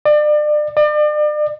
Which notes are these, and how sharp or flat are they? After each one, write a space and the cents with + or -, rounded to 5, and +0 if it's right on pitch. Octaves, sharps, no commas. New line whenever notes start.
D5 +35
D5 +40